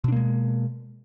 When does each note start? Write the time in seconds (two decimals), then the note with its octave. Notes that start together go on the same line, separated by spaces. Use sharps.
0.04 B2
0.08 D4
0.12 A#3
0.16 G#3